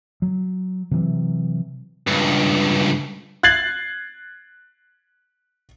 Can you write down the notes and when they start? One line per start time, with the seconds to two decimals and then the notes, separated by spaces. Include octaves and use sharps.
0.22 F#3
0.91 C3 E3 F#3
2.08 C#2 G2
3.43 F#6 G#6 A6 C7 F#7